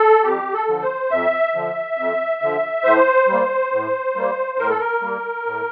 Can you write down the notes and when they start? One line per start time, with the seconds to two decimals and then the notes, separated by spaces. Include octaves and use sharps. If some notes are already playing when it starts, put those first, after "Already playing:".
Already playing: A4
0.23 F2 G4
0.54 A4
0.68 D3 F3
0.82 C5
1.11 F2 E5
1.55 D3 F3
1.98 F2
2.42 D3 F3
2.84 A2 C5
3.28 G3
3.33 A#3
3.72 A2
4.16 G3 A#3
4.58 A2 A#4
4.70 A4
4.79 A#4
5.01 G3 A#3
5.46 A2